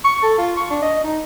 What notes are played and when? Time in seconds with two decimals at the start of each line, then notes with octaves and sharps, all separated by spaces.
0.04 C#6
0.23 A4
0.38 F4
0.57 C#6
0.70 D4
0.82 D#5
1.04 D#4